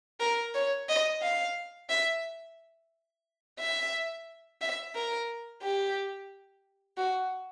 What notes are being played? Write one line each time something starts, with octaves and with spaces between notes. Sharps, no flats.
A#4
C#5
D#5
F5
E5
E5
E5
A#4
G4
F#4